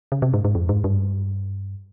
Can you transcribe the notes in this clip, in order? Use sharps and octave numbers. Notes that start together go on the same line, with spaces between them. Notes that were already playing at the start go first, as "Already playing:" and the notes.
C#3
C3
G#2
G#2
F2
G#2
G2